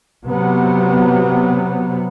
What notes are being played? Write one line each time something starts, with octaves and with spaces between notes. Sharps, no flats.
C3 F#3 B3